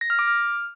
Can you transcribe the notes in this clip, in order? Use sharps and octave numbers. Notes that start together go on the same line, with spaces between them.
A#6
F6
D6
F6